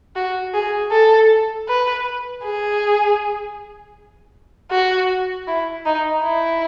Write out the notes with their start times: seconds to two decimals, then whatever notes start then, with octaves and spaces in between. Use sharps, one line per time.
0.16 F#4
0.54 G#4
0.92 A4
1.68 B4
2.44 G#4
4.72 F#4
5.48 E4
5.86 D#4
6.24 E4